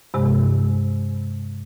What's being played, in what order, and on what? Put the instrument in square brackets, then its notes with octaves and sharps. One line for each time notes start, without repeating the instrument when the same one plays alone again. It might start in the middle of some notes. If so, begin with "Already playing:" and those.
[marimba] G2 C3 G#3